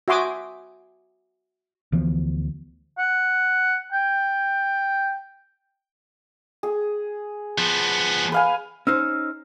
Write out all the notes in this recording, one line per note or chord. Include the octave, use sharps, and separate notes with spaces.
F#4 E5 G#5 C6 D6 D#6
D2 E3 F3 B3
F#5
G5
G#4
F3 B3
B4 F5 G#5
C#4 D#4 C5 E6 F6